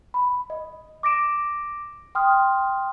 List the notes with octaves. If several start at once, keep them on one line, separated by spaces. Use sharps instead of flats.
B5
D#5
D6 A#6 D7 E7
G5 C6 D#6 F6